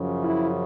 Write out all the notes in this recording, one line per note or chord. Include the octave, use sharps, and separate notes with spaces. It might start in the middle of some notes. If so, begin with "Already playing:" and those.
Already playing: F#2 C#3 F3
E4